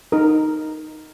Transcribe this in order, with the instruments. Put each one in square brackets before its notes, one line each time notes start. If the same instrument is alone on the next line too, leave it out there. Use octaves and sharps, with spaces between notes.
[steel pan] D#4 A#4